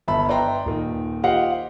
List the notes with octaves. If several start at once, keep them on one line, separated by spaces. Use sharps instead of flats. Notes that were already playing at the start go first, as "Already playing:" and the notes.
G1 E5 A5 B5
B4 D5 E5 G5 A#5 C6
D#1 D#3
F4 G4 C5 D#5 F5 F#5